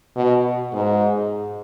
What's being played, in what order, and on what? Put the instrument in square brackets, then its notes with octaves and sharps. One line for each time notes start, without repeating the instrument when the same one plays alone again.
[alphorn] B2
G#2